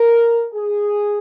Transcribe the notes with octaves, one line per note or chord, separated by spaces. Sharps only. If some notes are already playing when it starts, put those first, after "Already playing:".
Already playing: A#4
G#4